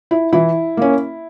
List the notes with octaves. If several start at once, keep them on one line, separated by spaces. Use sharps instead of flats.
E4
E3 E4
A#3 C#4